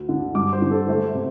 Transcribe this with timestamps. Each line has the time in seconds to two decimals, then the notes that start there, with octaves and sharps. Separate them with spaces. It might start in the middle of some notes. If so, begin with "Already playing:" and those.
Already playing: D2
0.09 D3
0.34 G2 D6
0.53 C5
0.62 D3
0.71 A4
0.88 A3 C5
1.14 C3